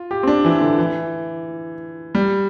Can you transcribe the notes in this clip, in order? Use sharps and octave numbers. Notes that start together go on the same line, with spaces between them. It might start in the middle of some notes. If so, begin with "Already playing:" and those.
Already playing: F4
G4
C4
D4
E3
D3
E3
G3